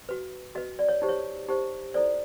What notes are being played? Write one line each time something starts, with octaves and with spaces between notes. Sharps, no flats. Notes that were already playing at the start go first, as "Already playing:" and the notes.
F#4 B4
F#4 B4 D#5
D5
C#5
D#4 G4 C5
C#5
D#4 G4 C5
E4 A4 C5 D5